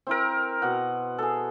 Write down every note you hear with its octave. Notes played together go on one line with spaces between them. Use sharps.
C4 E4 A#4
B2 F#5
G#4 A4